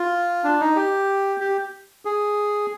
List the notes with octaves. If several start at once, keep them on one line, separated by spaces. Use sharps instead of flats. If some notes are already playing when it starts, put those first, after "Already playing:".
Already playing: F4
D4
D#4
G4
G4
G#4